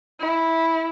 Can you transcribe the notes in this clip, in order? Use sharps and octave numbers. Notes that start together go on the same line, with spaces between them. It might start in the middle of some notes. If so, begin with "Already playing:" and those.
E4